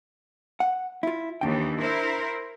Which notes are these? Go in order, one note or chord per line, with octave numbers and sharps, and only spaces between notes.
F#5
E4 F4
D#2 E3 D4 G5
E4 A#4 C5